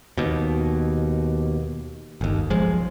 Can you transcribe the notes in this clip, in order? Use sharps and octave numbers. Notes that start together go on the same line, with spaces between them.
D#2 B2
G1 D#2
B1 F3 G#3